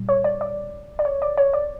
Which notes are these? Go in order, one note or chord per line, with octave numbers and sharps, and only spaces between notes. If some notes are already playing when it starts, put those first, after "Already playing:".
Already playing: A#2 G3
C#5
D5
D5
D5
C#5
D5
C#5
D5